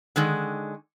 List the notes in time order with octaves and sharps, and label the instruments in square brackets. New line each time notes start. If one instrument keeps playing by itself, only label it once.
[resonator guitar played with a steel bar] D3 D#3 G#3